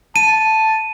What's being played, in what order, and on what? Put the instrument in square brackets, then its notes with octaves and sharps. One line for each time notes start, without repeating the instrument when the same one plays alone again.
[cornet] A5 [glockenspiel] D#7